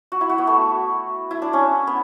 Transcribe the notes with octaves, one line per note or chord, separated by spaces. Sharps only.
F#4
E4
F#4
B3
A3
E4
D4
C#4
B3